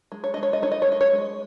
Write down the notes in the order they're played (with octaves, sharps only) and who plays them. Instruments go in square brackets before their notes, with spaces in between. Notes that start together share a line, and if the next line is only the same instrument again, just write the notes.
[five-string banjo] G#3
C#5
G#3 D#5
C#5
D#5
D#4 C#5
D#5
C#5
G#3 D#5
C#5
G#3